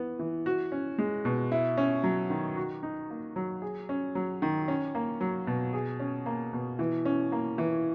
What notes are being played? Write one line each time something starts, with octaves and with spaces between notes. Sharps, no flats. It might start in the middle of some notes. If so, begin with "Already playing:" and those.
Already playing: E3 B3
E3
F#4
C#4
G#3
B2
E4
C#4
F#3
D#3
F#4
D#4
A#3
F#3
G#4
C#4
F#3
D#3
C#4
A#3
F#3
B2
G#4
C#4
A#3
B2
E3
C#4
A#3
E3